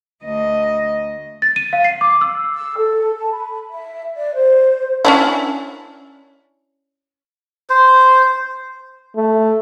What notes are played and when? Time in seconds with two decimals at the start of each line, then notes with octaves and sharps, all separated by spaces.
0.25 D2 D#5
1.42 A6
1.56 D#7
1.73 F5
1.84 C7
2.01 D6
2.21 E6
2.54 E6
2.76 A4
3.15 A5
3.32 B5
3.70 E5
4.15 D5
4.36 C5
5.05 C#4 D4 E4
7.70 C5
9.17 A3